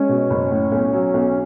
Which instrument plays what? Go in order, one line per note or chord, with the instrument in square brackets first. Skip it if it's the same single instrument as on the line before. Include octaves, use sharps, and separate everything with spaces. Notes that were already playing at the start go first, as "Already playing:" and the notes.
Already playing: [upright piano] G#3 [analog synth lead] C#4
[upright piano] B2
F#1
A2
B1
F#3
B1